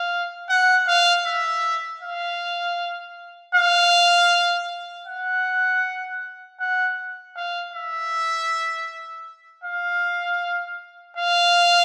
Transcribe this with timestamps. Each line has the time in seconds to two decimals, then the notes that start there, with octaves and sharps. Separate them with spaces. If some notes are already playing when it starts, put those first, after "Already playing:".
Already playing: F5
0.49 F#5
0.87 F5
1.25 E5
2.01 F5
3.55 F5
5.07 F#5
6.60 F#5
7.36 F5
7.74 E5
9.64 F5
11.17 F5